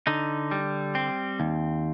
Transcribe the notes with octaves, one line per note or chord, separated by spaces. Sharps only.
D3 D#4
G3
C4
D#2